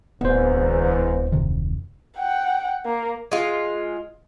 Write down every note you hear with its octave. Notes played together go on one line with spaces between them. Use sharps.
D1 E2 G#2 E3 B3 C5
F2 C3 D#3
F#5 G5
A#3
G#3 F4